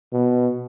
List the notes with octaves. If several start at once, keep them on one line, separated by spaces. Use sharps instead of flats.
B2